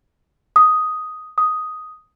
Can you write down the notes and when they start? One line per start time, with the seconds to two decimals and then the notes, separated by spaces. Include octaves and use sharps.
0.56 D#6
1.38 D#6